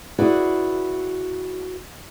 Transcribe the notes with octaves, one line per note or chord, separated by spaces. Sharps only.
E4 F#4 G#4 B4 D5